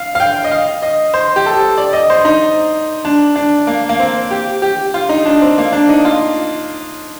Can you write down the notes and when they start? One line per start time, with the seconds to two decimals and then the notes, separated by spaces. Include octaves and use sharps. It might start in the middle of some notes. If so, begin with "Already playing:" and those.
Already playing: F5
0.15 F5
0.20 G5
0.45 D#5
0.51 F5
0.82 D#5
1.14 C5
1.36 G4
1.46 A4
1.78 D5
1.93 D#5
2.10 C5
2.25 D#4
3.05 D4
3.36 D4
3.67 A#3
3.89 A#3
3.99 C4
4.31 G4
4.62 G4
4.94 F4
5.09 D#4
5.26 D4
5.42 C4
5.58 A#3
5.73 D4
5.89 D#4
6.05 F4